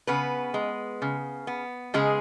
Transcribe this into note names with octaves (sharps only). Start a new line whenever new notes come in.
C#3 B3 B4
G#3
C#3
B3
C#3 G#3 G#4